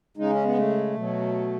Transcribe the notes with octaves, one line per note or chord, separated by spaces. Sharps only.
C#3 G#3 D#4
C#4
B3
A3
B2 F#3